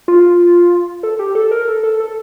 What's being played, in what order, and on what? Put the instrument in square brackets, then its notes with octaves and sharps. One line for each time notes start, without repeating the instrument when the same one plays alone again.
[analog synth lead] F4
A4
G4
A4
A#4
A4
A4
A4